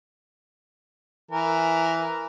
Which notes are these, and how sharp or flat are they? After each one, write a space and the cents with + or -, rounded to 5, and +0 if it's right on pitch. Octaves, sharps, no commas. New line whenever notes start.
E3 +5 A#4 +0